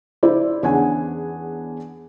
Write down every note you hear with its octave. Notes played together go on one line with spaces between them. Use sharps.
E4 C5 D5
E2 C#4 D4 G#4 F#5 G#5